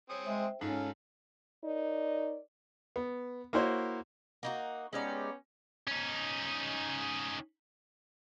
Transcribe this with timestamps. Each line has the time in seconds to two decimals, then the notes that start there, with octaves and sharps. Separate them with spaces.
0.10 C4 C#5 G#5 D#6
0.24 G#3 C5 E5 G5
0.61 G#2 G#3 C#4 F4 A4
1.64 D#4 A#4 C#5 D5
2.96 B3
3.53 A#3 E4 F#4 C5 C#5
4.43 A#3 D#4 F#4
4.93 G#3 B3 C#4 D#4 G4 D5
5.88 C#4 D#4